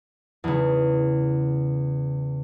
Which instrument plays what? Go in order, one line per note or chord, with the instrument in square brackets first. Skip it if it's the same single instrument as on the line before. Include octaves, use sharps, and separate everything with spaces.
[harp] E2 C#3